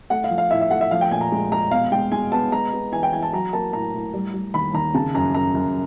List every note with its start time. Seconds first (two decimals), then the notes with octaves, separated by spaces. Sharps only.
0.10 A3 F#5
0.24 F5
0.30 F3
0.38 F5
0.51 A2 E5
0.61 E5
0.71 A3 F#5
0.81 E5
0.91 F3 F5
1.01 G5
1.11 A#2 G#5
1.21 A#5
1.32 G#3
1.52 G#3 A#5
1.71 B2 F5
1.92 G#3 G5
2.12 G#3 G#5
2.32 B3 A5
2.52 G#3 A#5
2.73 B3
2.93 E3 G#5
3.03 G5
3.13 E3 G#5
3.23 A5
3.33 F#3 A#5
3.53 A#3 A5
3.73 A2 A#5
3.94 A2
4.14 G3
4.34 G3
4.54 D#2 B5
4.74 D#2 A#5
4.94 C#3 A5
5.14 F#2 A#5
5.35 F#2 A#5
5.55 F#2